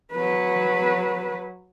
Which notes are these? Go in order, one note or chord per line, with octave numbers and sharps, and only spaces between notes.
F#3 B4